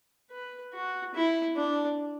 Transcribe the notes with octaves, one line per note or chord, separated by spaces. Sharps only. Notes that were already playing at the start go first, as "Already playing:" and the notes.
B4
F#4
E4
D4